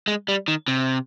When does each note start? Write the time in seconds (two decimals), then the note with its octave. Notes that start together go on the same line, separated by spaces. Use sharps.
0.08 G#3
0.28 G3
0.48 D#3
0.68 C3